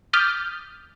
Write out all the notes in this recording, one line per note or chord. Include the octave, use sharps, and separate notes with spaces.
D6 D#6 F6 G6 A6 B6